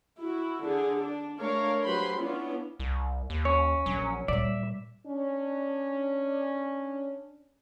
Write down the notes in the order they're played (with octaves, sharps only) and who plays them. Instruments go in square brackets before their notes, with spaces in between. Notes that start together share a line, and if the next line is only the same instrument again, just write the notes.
[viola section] E4 F#4
D3 G#4
D4
A3 D4 A#4 C#5 F5
F#3 G4 B4 C5 B5 C6
B3 C#4 D4 E4 F4
[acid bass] C2
D#2
[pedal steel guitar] C#4 [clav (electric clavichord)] C#5
[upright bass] A#1 [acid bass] F#3
[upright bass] A#2 G3 [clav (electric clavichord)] D5 [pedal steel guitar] E5
[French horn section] C#4 D4